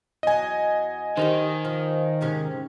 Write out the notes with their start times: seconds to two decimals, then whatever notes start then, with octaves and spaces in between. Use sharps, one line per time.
0.23 E2 F#3 D#5 G#5
1.17 D#3 D#4 G4 A4 C5
1.65 F3
2.21 G#2 C3 C#4